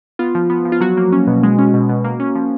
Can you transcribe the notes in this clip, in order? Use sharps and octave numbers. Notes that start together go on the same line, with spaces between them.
B3 F4
F3
B3
F3
F4
F#3 F#4
A#3
C#4
B2
G#3
C#4
B2
B2
A#3
C#4
F3